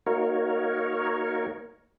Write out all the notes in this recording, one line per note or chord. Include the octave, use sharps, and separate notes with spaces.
A#3 D#4 F#4 A#4 C#5